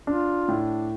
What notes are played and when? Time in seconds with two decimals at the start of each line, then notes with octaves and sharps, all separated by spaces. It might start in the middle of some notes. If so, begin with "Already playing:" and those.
0.07 D4 F4
0.48 A2